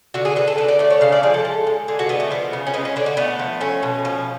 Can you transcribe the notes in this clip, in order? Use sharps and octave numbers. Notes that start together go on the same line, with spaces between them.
D3 F#4
G#4
D3 B4
A4
D3 B4
D5
A3 D5
C#5
C#3 F5
D5
F3 G#4
A4
G#3
G#3
D3 G#4
F#4
D3 B3
A3
F3 B3
C#3
C#4
G#3 B3
C#4
D3 D4
F#4
A3 B3
F3
A3 C#4
B2
F3